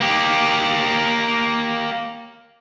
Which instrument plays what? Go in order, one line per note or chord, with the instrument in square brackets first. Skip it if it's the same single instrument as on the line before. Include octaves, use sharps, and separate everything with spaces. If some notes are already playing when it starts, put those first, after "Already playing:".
[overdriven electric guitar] A#3 G4